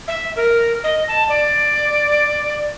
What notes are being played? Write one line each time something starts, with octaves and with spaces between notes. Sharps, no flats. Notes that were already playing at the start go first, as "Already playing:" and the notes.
E5
A#4
D#5
A5
D5